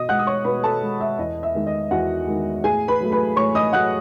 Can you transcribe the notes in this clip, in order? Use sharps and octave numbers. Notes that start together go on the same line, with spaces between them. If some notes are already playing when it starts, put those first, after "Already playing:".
Already playing: B2 D#5 D#6
G#3 F#5 F#6
D#6
C#5 C#6
B2 B4 B5
A4 A5
G#3
E5
E2 D#5
E5
D#3 G#3
D#5
E2 F#4 F#5
D#3 G#3
A2 G#4 G#5
B4 B5
F#3 A3
B4 B5
A2 C#5 C#6
D#5 D#6
F#3 A3 F#5 F#6